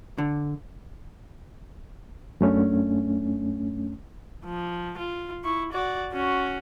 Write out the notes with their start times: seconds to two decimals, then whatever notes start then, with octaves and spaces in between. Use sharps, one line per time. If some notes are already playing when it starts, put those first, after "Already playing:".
0.18 D3
2.41 F#2 A3 C#4 D4
4.45 F3
4.98 F4
5.44 E4 C#6
5.73 F#4 D5
6.13 C#4 F#4